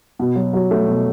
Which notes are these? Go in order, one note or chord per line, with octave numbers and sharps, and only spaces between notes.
B2
F#3
F#3
A3
B2